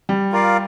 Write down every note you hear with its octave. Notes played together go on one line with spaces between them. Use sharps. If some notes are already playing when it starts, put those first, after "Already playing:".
G3
F4 A#4 D5 F5